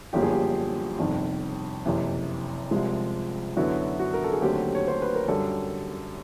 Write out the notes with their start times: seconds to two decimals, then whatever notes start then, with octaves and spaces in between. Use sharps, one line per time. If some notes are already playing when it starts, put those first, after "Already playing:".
0.13 G1 F#2 D3 F3 A#3 G4
0.23 G#4
0.32 G4
0.99 G1 F2 C3 D#3
1.85 F#1 F2 C3 E3
2.71 C2 C3 F3 G#3
3.57 F#2 D3 F#3 B3 E4 F#4
3.99 F#4
4.14 A#4
4.24 A4
4.33 G#4
4.42 D#2 D3 F#3 A3 C4 G4
4.75 C#5
4.88 C5
5.02 B4
5.15 A#4
5.28 F#2 D3 G3 A4